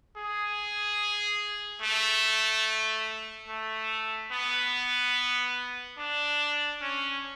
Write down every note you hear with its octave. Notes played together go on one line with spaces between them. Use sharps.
G#4
A3
A3
B3
D4
C#4